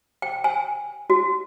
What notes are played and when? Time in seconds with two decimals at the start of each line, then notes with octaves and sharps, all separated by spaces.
0.22 G5
0.44 G#5
1.10 F#4